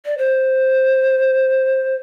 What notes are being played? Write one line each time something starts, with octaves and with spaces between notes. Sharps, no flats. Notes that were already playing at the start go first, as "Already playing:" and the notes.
D5
C5